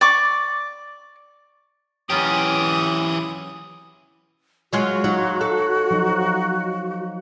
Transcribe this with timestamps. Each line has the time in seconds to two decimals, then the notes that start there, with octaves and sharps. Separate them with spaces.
0.01 D5 C#6 D6
2.10 E3 F#3 C#4 F4 G4 D#6
4.73 F#3 G#3 F4 F#4
5.04 F#3 D#4 F4 C#5
5.41 A4
5.91 F3 F#3 D#4